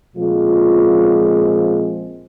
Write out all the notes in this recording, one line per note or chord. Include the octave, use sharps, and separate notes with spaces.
A#2 F3 G#3 C4 F4